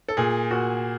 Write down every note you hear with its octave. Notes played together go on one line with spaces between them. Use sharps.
A4
A#2 G#4
A#2 F#4